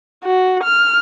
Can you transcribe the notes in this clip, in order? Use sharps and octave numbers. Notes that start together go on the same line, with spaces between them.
F#4
F6